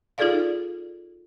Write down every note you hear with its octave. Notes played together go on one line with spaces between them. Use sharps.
D#4 F4 G#4 A4 D5 F5